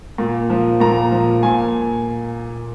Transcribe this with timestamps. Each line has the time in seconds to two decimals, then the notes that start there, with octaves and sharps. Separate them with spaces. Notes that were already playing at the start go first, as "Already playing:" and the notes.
0.18 A#2
0.50 F3
0.80 A#2 A#5
1.12 F3
1.43 A#2 G#5